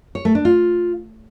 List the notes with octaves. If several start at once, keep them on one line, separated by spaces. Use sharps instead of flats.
C#5
A3
D4
F4